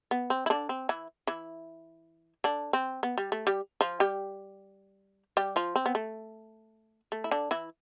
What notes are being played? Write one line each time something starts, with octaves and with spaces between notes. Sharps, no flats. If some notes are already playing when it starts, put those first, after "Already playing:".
B3
C4
E4
D3 D4
C4
E3 E4
E3 E4
D3 D4
C4
B3
G3
A3
G3 G4
F3 F4
G3 G4
G3 G4
F3 F4
C4
B3
A3
A3
E4
D3 D4
E3 E4